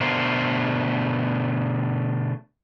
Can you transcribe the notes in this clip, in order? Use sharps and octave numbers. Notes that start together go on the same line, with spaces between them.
B2 D3 A3 A#4 C5